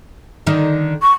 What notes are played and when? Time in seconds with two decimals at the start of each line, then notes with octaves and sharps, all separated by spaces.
0.47 D3 D#3 D#4
1.02 C#6